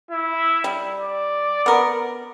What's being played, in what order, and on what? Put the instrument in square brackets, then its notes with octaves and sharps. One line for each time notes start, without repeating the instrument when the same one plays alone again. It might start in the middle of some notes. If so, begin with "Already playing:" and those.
[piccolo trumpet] E4
[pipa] G3
[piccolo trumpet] D5
[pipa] B3 A#4